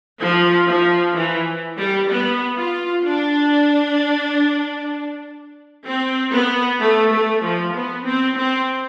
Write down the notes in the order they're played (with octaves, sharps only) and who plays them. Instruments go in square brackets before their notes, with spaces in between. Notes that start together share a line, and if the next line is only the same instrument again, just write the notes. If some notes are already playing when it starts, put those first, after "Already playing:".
[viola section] F3
F3
E3
G3
B3
F4
D4
C4
B3
A3
A3
F3
B3
C4
C4